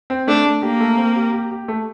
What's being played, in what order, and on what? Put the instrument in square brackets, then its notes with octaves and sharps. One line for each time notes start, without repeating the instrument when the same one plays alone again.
[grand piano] C4
[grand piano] A3 [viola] D4
[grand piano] A3
[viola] A#3 [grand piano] G4
[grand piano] A3
C4
G4
G4
G4
A3